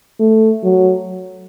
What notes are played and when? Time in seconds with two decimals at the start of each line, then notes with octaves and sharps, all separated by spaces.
0.20 A3
0.64 F#3